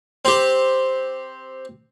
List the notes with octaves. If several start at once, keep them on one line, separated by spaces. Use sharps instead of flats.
C4 G4